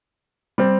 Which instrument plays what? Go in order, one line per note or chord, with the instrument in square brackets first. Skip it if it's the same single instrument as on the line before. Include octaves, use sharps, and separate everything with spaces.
[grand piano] G3 C4